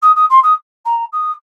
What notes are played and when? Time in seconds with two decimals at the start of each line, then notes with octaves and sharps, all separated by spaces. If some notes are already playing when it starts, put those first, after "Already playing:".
0.02 D#6
0.16 D#6
0.30 C6
0.43 D#6
0.85 A#5
1.12 D#6